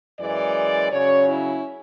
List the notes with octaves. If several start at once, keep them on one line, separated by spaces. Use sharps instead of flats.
F#2 E3 G#3 D5
C#3 F#3 C#4 C#5
E4